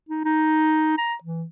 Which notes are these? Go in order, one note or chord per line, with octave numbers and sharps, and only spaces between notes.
D#4
D#4
A#5
E3